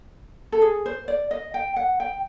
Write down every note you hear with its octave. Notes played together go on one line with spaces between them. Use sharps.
A4
G#4
C5
D5
D#5
G5
F#5
G5